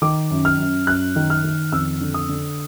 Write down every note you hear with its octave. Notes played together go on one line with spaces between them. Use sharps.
D#3 D6
F#2
F6
F#2
F#2 F#6
D#3
F6
D#3
F2 E6
D3
D#6
D3